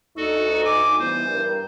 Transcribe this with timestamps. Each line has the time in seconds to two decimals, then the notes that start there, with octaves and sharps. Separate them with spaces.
0.17 D2 D#4 F#4 A4
0.65 G#5 D6
0.99 G2 E3 B3 C5
1.29 G2 A#4